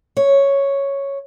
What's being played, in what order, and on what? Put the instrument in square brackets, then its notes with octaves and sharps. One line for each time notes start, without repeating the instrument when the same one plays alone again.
[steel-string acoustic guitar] C#5